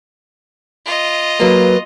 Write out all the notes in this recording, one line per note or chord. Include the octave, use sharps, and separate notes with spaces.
F4 D#5
F#3 A#3 B4